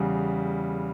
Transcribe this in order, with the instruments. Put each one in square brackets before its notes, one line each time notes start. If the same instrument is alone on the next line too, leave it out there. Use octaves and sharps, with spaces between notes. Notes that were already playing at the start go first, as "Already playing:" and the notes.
Already playing: [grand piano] E2 C#3 G3